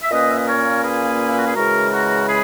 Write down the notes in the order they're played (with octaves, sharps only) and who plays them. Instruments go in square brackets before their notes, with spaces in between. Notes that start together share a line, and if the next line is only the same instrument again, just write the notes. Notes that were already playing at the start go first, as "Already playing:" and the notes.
[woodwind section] E5
A#2 A#3 C#4 B4 D#5
E5
D#5
A#4 C#5
G#4 B4
E4
F#4
G#4
C#3 E3 G#3 F#4 A#4
F#4 A#4
G#4 B4